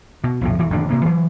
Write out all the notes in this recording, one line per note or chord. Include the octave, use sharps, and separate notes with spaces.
B2
B1 F2 A2
E1 E3
E1 A1 D#3 D4
C3 A#3
E3 F#3